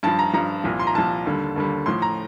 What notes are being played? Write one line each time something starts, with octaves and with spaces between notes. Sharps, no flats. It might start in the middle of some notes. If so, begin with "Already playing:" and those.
G2 F3 A5
A#5
G2 F3 A#5
C2 A#2 F3
C6
A#5
C2 A#2 F3 A5
D#2 D3 G3
D#2 D3 G3
A2 F3 C6
A#5